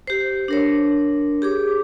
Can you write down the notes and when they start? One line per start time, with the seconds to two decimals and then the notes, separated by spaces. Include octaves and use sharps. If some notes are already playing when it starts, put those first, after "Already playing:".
0.07 G4 C5
0.48 D4 A#4 C#5
1.42 G4 G#4 D6